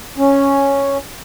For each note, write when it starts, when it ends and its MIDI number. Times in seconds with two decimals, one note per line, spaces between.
0.18 0.97 61